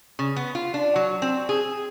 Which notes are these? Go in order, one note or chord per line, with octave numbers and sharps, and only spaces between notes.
C#3
B3
F4
D4
F#3
C4
G#4